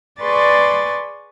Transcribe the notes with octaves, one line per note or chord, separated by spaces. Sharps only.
G#4 B4 D5 C6 C#6 A6